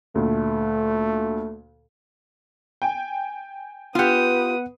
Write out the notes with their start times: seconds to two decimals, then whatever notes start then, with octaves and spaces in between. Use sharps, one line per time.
0.15 D2 A#2 A3
2.82 G5 G#5
3.95 B3 F4 G4 B4 F#5 D#6